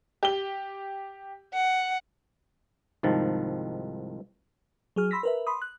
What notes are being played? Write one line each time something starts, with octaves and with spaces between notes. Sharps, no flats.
G4 G7
F#5
C2 G#2 D#3 F3 A5
F#3 G#4 F6
B5 C6 E6 A#6 B6
A#4 B4 E5
B5 C6 D#6
F#6